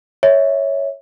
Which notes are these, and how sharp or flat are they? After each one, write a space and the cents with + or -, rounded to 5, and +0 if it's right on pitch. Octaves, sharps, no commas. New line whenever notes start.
C#5 +0 E5 -20